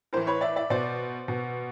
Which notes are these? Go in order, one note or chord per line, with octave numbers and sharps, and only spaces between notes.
A2 E3 A#4 C5
B4 C#5
D5 E5
D5 E5
B2 C5 D5
B2